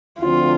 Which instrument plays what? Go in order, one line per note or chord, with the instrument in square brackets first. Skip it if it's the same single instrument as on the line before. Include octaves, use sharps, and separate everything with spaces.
[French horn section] D2 D3 F3 C4 [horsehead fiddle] F4